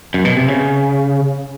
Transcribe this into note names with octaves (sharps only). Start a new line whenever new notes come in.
F#2
B2
C3
C#3